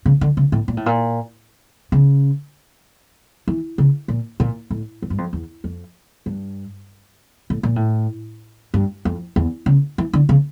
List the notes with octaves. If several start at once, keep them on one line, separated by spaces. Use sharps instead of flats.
C#3
D3
C#3
A2
A#2
A2
A#2
C#3
E3
C#3
A#2
A#2
A2
F2
G2
F2
E2
F2
G2
A2
A#2
A2
G2
F2
E2
C#3
E3
D3
C#3